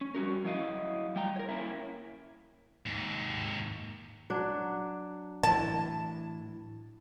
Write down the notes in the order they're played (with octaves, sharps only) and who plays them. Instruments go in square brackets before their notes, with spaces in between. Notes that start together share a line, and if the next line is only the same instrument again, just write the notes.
[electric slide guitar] C#4
G3 C#4 F#4 A#4
F#3 E4 D#5 F5
G3 G5 A#5
A#4 C#5
A#3 C#4 E4
[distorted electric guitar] D#2 G#2
[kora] F#3 D4
[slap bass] A2 E3 [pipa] A5